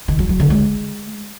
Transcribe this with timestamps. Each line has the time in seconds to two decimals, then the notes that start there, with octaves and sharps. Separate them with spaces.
0.08 D#3
0.19 F#3
0.29 F#3
0.40 D3
0.50 G#3